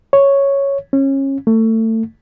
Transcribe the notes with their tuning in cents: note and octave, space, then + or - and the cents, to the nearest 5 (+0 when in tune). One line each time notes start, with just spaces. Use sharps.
C#5 +0
C#4 -25
A3 +25